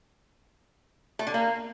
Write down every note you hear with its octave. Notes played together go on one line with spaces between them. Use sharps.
A3
D3
A#3